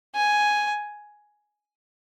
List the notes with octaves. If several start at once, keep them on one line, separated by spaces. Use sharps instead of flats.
G#5